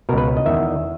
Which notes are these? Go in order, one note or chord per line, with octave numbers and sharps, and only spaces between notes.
C#2 B2 A#4
B4
C#5
D#5
E2 D#3 E5